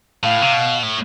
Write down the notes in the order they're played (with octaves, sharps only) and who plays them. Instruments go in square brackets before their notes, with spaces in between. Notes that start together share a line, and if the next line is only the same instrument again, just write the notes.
[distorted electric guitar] A2 [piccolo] F5
[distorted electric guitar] C3
B2
A2